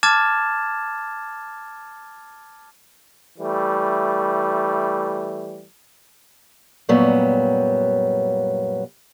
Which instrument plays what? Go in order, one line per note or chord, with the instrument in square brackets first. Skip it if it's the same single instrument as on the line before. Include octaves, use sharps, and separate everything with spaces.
[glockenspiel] A5 D6 F6 G#6 A6 E7
[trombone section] E3 G3 A3
[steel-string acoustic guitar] F#2 A#2 F#3 G3 B3